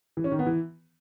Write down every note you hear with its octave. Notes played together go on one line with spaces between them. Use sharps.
E3
C#4
D#3
B3
E3